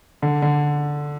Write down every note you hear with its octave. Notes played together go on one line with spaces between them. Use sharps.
D3
D3